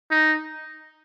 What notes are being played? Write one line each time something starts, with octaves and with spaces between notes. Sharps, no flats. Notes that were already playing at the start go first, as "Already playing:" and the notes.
D#4